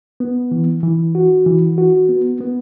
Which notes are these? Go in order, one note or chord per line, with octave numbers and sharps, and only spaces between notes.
B3
E3
E3
F#4
E3
F#4
B3
B3